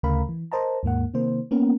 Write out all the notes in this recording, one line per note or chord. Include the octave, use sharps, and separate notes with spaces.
D2 C#3 A3 A#4 F5 B5
E3
A#4 C5 D#5 A5 A#5
D#2 G#2 A#3 F#5
C3 D#3 A#3 C5
A#3 B3 C#4 A#4